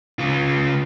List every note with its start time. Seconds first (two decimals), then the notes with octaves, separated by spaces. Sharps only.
0.19 C#3 F4